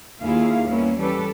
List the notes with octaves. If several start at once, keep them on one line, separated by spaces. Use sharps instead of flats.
D#2 A#3 E4 F4 G#4 F5
G3 A#3 B3 C#4 E4
E3 G3 C#4 G4 A4 B4